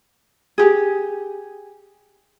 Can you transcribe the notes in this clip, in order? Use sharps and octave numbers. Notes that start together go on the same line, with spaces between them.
G4 G#4